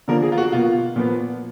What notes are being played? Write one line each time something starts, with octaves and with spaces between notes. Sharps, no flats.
D3 F3 A#3 A#4
G#4
F4
F#4
B2 A#3 F4
A#2 F3 B3